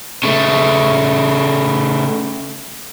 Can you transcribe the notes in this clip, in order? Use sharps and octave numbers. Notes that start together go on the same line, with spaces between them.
C#3 A3